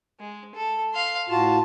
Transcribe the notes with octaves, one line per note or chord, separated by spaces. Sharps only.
G#3
A4
F5 C6
A2 F4 F#4 A5